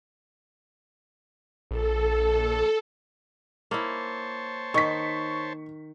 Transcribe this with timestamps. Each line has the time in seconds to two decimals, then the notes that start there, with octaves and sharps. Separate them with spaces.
1.71 A#1 A4
3.71 A#3 E4 C5 C#5 A5
4.74 D#3 C#6 B6